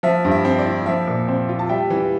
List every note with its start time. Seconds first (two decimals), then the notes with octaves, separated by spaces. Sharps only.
0.03 F3 E5
0.24 G2
0.31 E5
0.45 C4
0.59 D5
0.66 E4
0.86 F3 E5
1.07 A#2
1.28 C4
1.49 F4
1.59 A5
1.69 G3 E5 G5
1.90 E3